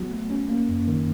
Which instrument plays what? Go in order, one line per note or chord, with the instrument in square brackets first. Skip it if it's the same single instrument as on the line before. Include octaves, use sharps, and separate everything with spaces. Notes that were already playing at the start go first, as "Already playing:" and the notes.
Already playing: [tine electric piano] F#3 B3 F#4
A3
C#4
A#3
F#2
D#3